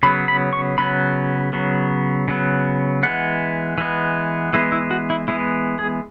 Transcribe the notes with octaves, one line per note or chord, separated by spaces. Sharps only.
C#3 F#3 B3 B5
B5
C#6
C#3 F#3 B3 B5
C#3 F#3 B3
C#3 F#3 B3
E3 G#3 B3 F#5
E3 G#3 B3
E3 G#3 B3 E4
E4
F#4
E4
E3 G#3 B3 E4
G#4